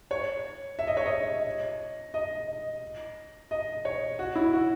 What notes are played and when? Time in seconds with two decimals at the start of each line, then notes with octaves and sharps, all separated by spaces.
0.11 C#5
0.79 E5
0.87 D#5
0.97 C#5
1.06 D#5
2.14 D#5
3.51 D#5
3.85 C#5
4.19 F#4
4.35 E4
4.53 F#4